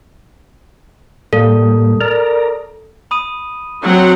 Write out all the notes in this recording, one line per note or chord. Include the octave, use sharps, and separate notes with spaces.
A2 G3 A#3 A4
A#4 D5 A#5
B5 D#6 D#7
F#3 C4 F#5